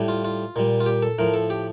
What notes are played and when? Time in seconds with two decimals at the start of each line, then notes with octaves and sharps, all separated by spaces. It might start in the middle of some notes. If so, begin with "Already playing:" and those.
Already playing: A2 G3
0.08 F4
0.25 F4
0.56 A#2 G3
0.80 F4
0.86 G4
1.03 A4
1.19 A2 F3 A#4
1.34 A4
1.50 G4